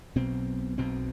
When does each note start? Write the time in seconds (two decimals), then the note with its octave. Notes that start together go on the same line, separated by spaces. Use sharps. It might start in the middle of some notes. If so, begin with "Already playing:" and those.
0.16 B1 B2 C4
0.78 B1 B2 C4